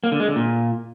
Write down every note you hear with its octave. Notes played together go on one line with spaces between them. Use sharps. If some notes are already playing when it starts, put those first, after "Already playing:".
A#3
D3
G#3
D3
A#2